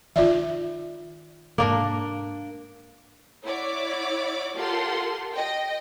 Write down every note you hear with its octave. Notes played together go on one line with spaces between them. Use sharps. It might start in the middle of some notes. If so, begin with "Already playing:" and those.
D#3 D#4 F4 D5 E5
G#2 A#3 D4 A#4
E4 C#5 D5 F#5 D6
F4 G4 A4 A#4 F#5 C6
D#5 G5